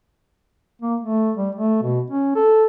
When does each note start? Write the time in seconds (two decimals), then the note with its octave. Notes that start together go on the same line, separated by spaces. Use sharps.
0.82 A#3
1.00 A3
1.37 G3
1.55 A3
1.82 B2
2.11 C#4
2.35 A4